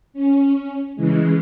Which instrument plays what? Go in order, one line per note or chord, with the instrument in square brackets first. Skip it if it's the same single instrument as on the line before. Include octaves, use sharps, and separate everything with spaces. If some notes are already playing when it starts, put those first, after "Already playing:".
[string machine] C#4
C#3 E3 G#3